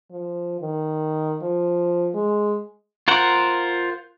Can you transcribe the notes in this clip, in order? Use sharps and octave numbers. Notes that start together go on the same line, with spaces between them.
F3
D#3
F3
G#3
F4 A#4 C5 F#5